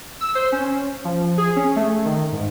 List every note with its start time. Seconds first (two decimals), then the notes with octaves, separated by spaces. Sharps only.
0.21 E6
0.35 C5
0.52 C#4
1.04 F3
1.38 G#4
1.56 C#4
1.76 A3
2.05 D#3
2.32 G#2